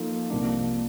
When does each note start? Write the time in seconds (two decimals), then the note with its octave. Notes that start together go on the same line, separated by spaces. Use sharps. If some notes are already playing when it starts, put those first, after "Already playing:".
Already playing: F3 A#3 D#4 A4
0.30 C2 C3 F3 A#3 D4